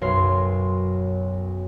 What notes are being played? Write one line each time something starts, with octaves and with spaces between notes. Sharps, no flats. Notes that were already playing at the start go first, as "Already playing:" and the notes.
B1 F#2 A#4 C#5 C6 C7